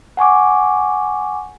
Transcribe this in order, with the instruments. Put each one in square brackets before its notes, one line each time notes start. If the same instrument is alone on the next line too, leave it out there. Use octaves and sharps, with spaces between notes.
[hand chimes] F#5 G#5 C#6 D6